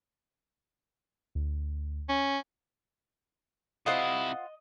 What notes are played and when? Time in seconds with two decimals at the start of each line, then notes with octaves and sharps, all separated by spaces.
1.35 D2
2.09 C#4
3.86 C3 E4 F4 C5 D#5 F#5